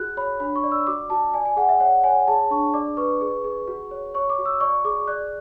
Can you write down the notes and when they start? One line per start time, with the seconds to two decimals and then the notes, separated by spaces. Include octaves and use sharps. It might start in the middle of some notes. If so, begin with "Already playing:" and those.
Already playing: F#4 G#4 F#6
0.17 C#5 B5
0.40 D4 B5
0.56 C#6
0.64 D5
0.72 E6
0.87 F#4 D6
1.10 F#4 A5
1.34 D5 G#5
1.45 G#5
1.57 G#4 F#5
1.69 E5
1.80 C#5 F#5
2.04 C#5 G#5
2.27 G#4 A5
2.51 D4 C#6
2.74 D5 D6
2.97 B4 C#6
3.21 G#4
3.44 G#4
3.68 F#4
3.91 C#5
4.14 C#5 C#6
4.30 D6
4.38 F#4
4.46 E6
4.61 D5 C#6
4.85 G#4 D6
5.07 D5 F#6